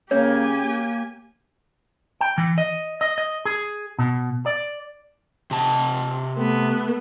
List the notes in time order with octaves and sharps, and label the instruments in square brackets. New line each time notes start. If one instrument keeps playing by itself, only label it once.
[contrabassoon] C#3 [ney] A#3 [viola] G4 G#5 [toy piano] C#5
[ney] A#3
[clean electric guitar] G5
E3
D#5
D#5
D#5
G#4
B2
D5
[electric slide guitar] C3 A5
[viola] A3 B3